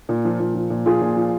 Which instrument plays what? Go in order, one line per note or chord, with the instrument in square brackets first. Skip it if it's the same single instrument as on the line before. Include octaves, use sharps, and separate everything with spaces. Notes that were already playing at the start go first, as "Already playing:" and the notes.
[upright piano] A#2
F3
A#2
F3
A#2
F3 F4 G#4
A#2
F3